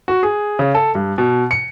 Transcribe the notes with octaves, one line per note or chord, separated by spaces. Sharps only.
F#4
G#4
C#3
A4
G2
B2
C#7